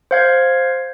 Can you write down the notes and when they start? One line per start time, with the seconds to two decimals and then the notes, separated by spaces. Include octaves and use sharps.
0.11 C5 F5 G#6